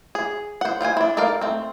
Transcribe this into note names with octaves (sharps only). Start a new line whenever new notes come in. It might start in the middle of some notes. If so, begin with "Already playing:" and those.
G#4
C5 F#5
F4 C5 G5 G#5
D4 E4
D#4 A4 A#4 D5 F5
A3 C4